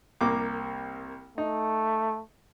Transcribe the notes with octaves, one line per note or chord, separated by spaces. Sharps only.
C2 A#3 D6
A3 D#4